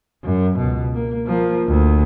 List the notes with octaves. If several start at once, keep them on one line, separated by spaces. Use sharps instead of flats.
F#2
C#2 B2
A#3
F3 A#3
D2